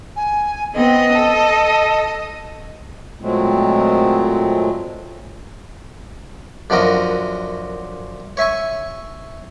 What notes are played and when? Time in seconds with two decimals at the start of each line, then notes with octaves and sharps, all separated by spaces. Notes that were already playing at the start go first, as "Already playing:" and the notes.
0.16 G#5
0.74 B3 C4 D#5
1.11 A4
3.22 A#2 F#3 G#3 A3 C4
6.70 F#2 D3 F3 F#4 A#4 D#5
8.37 C#5 E5 G#5 C#6